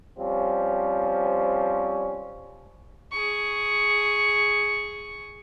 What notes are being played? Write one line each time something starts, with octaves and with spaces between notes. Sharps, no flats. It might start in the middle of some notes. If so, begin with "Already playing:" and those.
F3 G3 C4 C#4
G#4 C#6